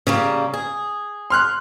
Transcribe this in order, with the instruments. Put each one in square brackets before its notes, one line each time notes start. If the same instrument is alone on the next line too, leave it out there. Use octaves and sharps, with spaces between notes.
[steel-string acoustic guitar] C#3 G3 A#3
G#4
[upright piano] C6 F6 F#6